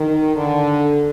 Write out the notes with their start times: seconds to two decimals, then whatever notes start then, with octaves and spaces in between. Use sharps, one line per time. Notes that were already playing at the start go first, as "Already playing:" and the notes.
Already playing: D#3
0.36 D3